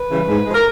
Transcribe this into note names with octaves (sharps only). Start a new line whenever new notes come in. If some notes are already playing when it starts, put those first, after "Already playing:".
Already playing: B4
C#3 E3 G3
G#2
F3 G#3
A#4